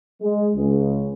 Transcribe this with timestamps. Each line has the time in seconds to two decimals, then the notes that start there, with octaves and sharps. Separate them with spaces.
0.22 G#3
0.55 C#2